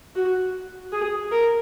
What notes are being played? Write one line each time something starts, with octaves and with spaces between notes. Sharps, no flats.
F#4
G#4
A#4